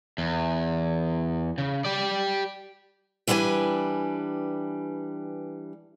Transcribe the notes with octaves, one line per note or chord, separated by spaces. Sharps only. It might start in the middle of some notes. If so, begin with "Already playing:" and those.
E2
C#3
G4 D5
E3 G3 D4 B4 G#5